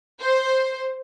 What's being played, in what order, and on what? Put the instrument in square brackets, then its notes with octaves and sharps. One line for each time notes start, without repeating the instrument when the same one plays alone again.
[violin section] C5